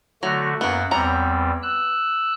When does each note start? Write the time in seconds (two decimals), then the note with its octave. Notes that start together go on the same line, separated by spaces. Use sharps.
0.23 D3 F#3 A3 F#4
0.61 F#2 A#3 B3 F#5
0.91 E2 G3 B3 C4 C#5 A#5
1.63 E6 F#6